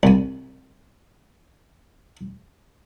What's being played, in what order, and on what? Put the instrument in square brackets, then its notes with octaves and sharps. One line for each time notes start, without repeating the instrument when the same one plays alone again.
[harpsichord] C2 G#5